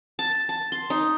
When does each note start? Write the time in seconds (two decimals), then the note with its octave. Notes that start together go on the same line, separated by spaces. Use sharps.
0.19 A5
0.49 A5
0.72 C6
0.90 D#4